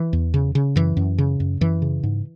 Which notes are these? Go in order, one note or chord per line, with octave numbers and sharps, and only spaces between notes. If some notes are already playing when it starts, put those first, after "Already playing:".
Already playing: E3
E2
C#3
C#3
F#2 E3
F#2
C#3
F#2
F#2 E3
C#3
G#2